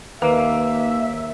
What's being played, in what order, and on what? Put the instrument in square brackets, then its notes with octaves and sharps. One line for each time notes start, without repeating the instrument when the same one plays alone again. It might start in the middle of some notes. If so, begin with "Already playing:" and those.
[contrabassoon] D#2 [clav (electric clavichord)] A#3 [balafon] B4 [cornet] E5